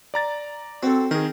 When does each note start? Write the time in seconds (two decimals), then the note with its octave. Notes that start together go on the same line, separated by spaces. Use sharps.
0.14 D5 A#5 A6
0.83 C4 F#4 A4
1.11 D#3 G#4 A#4